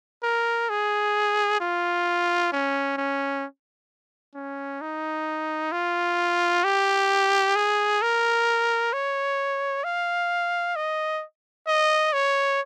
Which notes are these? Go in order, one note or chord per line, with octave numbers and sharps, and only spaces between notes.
A#4
G#4
F4
C#4
C#4
C#4
D#4
F4
G4
G#4
A#4
C#5
F5
D#5
D#5
C#5